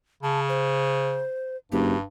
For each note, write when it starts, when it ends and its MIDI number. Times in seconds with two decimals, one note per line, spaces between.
0.23 1.25 49
0.23 0.40 81
0.49 1.56 72
1.72 1.94 30
1.72 2.03 43
1.72 1.97 67